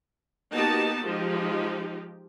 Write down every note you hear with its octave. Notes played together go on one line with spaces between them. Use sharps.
A#3 B3 D#4 F#4 G4 A5
F3 G#3 D#4 G4